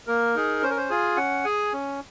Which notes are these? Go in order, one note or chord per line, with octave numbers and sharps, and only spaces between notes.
A#3 A#4
D#4 G#4
C#4 C5
A#4
C5
F4 G#4 G#5
C#4 F#5
G#4 G#5
C#4